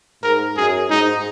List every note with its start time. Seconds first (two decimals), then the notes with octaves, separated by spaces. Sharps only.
0.23 G#2 A#4
0.56 F#2 G#4
0.90 G#2 D#4